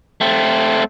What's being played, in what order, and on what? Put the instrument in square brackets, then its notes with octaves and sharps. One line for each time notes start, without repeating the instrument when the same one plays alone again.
[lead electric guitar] A3 C4